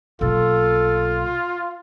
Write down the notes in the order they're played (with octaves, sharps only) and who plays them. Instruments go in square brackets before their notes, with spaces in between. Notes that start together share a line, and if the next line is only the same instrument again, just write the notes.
[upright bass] B1 A#2 [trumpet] F4 [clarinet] A4